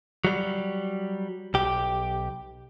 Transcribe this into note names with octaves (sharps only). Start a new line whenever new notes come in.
F#3 G3
B1 G4